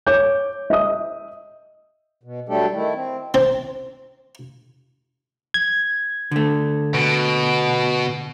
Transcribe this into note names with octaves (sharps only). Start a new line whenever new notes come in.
C#5 D6 G6
D#5 E5 D#6
B2
F#3 G3 A3 D4 G4 A4
D#3 A3 E4
C4
C4
G#6
D3 A3
B2